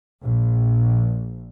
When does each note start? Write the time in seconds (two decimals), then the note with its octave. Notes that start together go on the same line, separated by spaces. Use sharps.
0.24 A#1